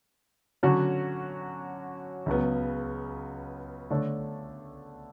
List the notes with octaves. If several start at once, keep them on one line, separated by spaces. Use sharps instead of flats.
D3 F#3 C#4 F#4
C#2 C#3 F#3 B3
D3 A3 D4 A4 C#5